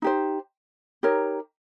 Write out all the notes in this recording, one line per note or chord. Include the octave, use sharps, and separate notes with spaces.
D#4 G4 C5
D#4 G4 A#4 C#5